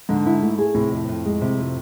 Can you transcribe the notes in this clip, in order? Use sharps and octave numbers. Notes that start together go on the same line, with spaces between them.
G#2 D3
E4
A3
G#4
A2 C3
F2
F2
G#3
C3
F2